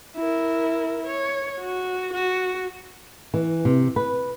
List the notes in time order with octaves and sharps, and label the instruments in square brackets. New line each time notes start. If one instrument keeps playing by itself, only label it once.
[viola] E4 A#4
C#5
F#4
F#4
[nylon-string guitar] E3
C3
B4